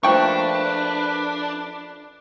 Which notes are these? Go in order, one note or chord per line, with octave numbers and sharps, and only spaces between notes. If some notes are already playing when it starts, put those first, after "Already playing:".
F3 A3 A#3 D4 B4 G5 C#6